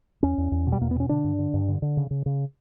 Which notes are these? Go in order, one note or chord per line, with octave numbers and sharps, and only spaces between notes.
E2 C#4
E2
E2
B2
G3
E2 A#3
B3
B2 C#4
D3 D4
G2
D3
G2
D3
D3
C#3
C#3
C#3